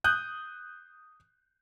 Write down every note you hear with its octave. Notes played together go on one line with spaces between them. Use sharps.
D#6 F#6 G6